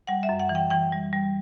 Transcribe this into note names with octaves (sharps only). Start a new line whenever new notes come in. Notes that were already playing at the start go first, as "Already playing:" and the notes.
G3 F#5
E5
F#2
F#5
E3
G5
E3 G5
G3
G3